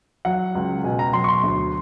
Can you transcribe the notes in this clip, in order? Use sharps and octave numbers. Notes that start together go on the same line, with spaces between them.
F#3 F#5
C#2
B2 G#5
A#5
F#3 C6
C#6
C6
D2